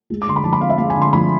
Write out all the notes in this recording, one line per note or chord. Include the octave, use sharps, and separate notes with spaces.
G#3
D6
D3 C6
B5
F3 A5
B5
C4 F5
E5
G#3 F5
G#5
D3
C6
F3 B5